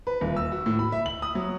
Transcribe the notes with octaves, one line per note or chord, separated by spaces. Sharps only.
B4
D#1
E6
F#4
A2
B5
E5
F#7
D#6
F#3